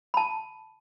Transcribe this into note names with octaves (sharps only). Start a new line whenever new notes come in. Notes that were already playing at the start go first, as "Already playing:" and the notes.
A5 B5